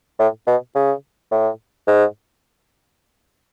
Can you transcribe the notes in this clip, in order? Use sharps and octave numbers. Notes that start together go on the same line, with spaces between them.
A2
B2
C#3
A2
G#2